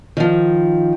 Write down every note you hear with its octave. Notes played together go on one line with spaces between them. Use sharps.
D#3 F3